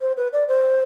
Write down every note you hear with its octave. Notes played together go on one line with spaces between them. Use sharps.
C5
B4
D5
C5